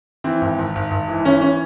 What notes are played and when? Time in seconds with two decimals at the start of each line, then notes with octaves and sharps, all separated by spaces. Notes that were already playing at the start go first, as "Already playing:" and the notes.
0.24 E3 C4
0.41 G#1
0.59 G#1
0.75 G#1
0.91 G#1
1.08 E3
1.25 E3 C#4
1.41 C#4